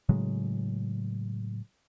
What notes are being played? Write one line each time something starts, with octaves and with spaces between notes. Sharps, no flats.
A2 C#3 F#3 G#3